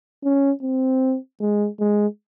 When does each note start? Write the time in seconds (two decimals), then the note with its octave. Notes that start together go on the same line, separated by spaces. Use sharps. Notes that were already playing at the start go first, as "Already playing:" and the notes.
0.24 C#4
0.62 C4
1.40 G#3
1.79 G#3